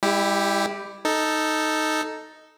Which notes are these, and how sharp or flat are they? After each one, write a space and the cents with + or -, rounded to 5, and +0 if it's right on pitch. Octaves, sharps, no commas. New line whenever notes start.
G3 +45 E4 +0 G4 +0
D#4 +0 A4 +0